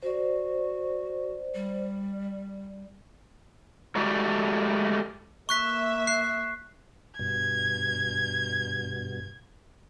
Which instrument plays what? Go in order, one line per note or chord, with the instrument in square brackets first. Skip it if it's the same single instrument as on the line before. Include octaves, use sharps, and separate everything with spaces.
[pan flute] F#4 [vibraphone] C5 D5
[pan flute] G3
[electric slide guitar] F#3 G#3 A3 F#4 G4 D5
[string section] A#3 E5 [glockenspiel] C#6 F#6 B6
[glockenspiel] F#6 C7
[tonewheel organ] G2 B2 [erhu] G#6